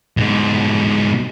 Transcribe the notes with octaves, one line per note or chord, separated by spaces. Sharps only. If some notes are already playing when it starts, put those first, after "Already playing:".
G#2 B2